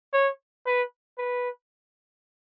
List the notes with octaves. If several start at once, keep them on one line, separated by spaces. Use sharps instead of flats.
C#5
B4
B4